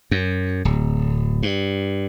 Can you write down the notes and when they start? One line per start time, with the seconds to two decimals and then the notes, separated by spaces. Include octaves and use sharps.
0.11 F#2
0.65 D1
1.43 G2